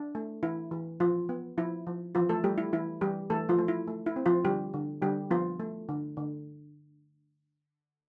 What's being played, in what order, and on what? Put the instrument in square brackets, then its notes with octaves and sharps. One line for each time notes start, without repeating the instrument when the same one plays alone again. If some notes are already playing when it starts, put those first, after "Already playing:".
Already playing: [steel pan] D4
A3
E3 E4
E3
F3 F4
B3
F3 E4
F3
E3 F3 F4
A3 A4
G3 A3 G4
E4
E3 E4
E3 G3 G4
E3 A3 A4
F3 F4
A3
E4
A3
E4
C4
F3 F4
D3 G3 G4
D3
D3 G3 G4
F3 B3 F4
A3
D3
D3